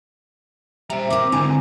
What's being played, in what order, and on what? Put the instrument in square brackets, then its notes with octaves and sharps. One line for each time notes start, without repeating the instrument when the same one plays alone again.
[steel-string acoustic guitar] G3 [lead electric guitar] C5 A#5 [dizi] E5
[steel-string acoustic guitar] C4 A#4 [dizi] D6
[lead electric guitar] G#2 D3 [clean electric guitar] C4 E4 G#5 [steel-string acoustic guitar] A#5